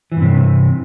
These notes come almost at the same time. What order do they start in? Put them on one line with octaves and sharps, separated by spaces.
E3 G2 C3